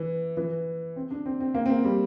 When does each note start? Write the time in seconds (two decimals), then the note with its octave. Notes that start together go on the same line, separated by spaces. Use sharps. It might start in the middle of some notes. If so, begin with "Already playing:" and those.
Already playing: E3
0.37 E3
0.96 C4
1.11 D4
1.26 C4
1.40 C4
1.54 A#3
1.66 C4
1.70 A#3
1.85 G3